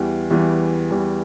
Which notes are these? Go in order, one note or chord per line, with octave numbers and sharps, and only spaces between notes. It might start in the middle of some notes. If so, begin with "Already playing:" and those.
Already playing: E2 E3 G3
E2 E3 G3
E2 E3 G3